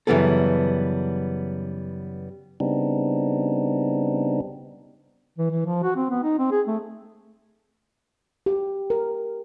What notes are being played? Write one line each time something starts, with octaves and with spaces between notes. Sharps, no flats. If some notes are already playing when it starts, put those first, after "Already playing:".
F#2 C#3 E3 G3 B3 A4
C#3 G3 B3 C4 D4 D#4
E3
E3
F3
F#4
C4
B3
D#4
C4
G#4
A3
G4
A#4